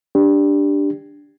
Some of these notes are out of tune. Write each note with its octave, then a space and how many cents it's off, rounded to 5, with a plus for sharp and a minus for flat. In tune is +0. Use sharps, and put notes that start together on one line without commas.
D4 +0 G4 +10